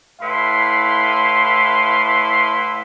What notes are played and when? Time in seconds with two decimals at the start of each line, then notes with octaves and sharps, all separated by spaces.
0.22 A2 E4 B4 F5 C6